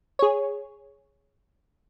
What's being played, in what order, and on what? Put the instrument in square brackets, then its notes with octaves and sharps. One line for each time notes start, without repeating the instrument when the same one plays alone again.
[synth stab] G#4 C#5